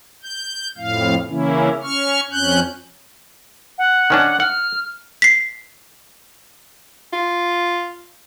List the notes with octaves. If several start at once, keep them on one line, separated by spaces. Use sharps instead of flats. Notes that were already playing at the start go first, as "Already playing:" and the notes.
G6
F2 A2 F5
C#3 E3 A#3 C#4 E4
C#4 C#6 F6
F2 C#4 F#6 G6
F#5
D#3 C#4 D4
F#5 F6
B6 C7
F4